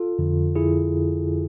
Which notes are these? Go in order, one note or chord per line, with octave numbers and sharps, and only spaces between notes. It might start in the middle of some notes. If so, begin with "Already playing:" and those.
Already playing: F4 A4
F2 D3 F3
E4 G#4